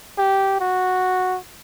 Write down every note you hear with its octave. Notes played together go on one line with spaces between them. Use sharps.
G4
F#4